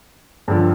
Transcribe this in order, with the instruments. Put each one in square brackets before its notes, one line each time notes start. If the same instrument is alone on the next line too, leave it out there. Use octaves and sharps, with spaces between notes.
[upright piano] G2 D3 F3